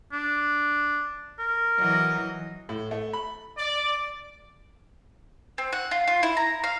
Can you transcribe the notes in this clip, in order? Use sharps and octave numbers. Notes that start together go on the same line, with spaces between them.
D4
A#4
E3 F#3 D#5
A2
A3
B5
D5
C4
F#5
F4
F4
E4
A#5
F5